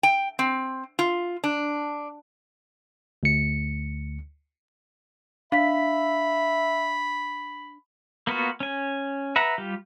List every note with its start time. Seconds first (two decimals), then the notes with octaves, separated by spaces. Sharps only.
0.03 G5
0.39 C4
0.99 F4
1.44 D4
3.23 D2 C#7
5.52 D4 E5 F5 B5 B6
8.27 A#3 B3 F4 F#4
8.60 C#4 G#5
9.36 B4 E5 F#5 A#5
9.58 G3 F4 G4